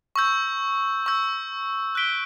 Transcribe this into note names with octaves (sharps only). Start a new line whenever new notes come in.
C#6 E6 G6
C#6 E6 G6
F#6 B6 D7 G7